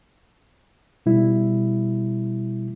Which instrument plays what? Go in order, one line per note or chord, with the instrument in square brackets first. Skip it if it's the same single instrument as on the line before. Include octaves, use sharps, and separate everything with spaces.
[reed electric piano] B2 G3 E4